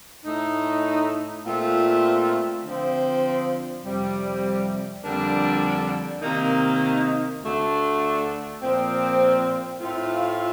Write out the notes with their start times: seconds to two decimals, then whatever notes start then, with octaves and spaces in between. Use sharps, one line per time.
0.24 A2 A3 D#4
1.44 A#2 A3 C4 F4
2.64 D3 F3 C4
3.83 F2 C3 G3
5.03 F2 D3 G3 A#3 D4
6.22 C3 D#3 A#3 D#4
7.42 D2 D3 A3 D4
8.62 A#2 F3 C4
9.80 A2 A3 C4 F4